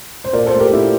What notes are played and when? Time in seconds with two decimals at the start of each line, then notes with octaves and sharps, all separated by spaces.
0.24 C5
0.33 A#2 A#4 D5
0.46 A4 C5
0.53 A3
0.59 G4 A#4
0.72 A#2 E4 G4